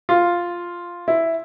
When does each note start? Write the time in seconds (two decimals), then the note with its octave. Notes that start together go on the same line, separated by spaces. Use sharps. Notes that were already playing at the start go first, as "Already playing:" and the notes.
0.09 F4
1.08 E4